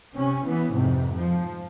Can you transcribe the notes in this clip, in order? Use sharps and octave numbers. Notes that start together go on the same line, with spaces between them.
C3 C#4
E3 B3
F2 G#2 C3
F3